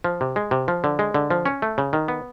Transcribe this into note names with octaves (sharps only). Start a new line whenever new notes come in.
F3
C3
G#3
C3
F3
D3
G#3
D3
F3
C#4
A3
C#3
D#3
B3